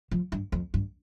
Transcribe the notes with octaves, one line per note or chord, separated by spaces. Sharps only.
F3
G2
F2
G2